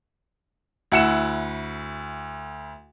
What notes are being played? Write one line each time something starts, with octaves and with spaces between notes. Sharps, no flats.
D2 E4 F#5 C#7 E7